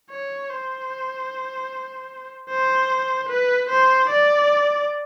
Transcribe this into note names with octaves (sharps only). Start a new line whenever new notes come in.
C#5
C5
C5
B4
C5
D5